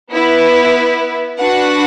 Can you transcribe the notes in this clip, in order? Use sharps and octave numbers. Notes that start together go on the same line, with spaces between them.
B3 E4 B4
D4 F#4 B4 F#5